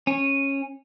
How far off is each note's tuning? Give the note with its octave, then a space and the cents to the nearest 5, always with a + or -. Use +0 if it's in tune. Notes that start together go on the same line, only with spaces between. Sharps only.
C#4 -15